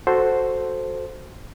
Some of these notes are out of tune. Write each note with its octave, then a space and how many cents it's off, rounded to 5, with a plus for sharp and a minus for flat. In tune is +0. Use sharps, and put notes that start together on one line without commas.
F#4 +0 A4 +0 C5 +0